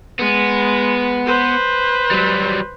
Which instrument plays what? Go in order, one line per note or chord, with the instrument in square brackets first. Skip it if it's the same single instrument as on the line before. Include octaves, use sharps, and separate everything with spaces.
[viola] G#3 [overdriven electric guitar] B3
[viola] B4 C5
[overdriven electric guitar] F#3 G3